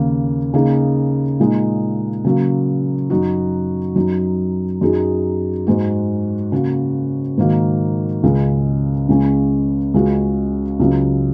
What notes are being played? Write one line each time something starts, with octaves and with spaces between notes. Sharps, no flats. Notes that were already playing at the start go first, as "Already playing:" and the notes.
Already playing: D#2 C#3 A#3
C#3 A#3 D#4 G#4
A#2 G#3 D#4
C#3 F#3 A#3
F#2 F#3 D#4 F#4
F#2 F#3 D#4
F#2 F#3 D#4 G#4
G#2 G#3 F#4
C#3 A#3 F#4
G#2 D#3 A#3 F#4
C#2 C#3 G#3
C#2 C#3 G#3 C#4
C#2 C#3 G#3 F#4
C#2 C#3 F#3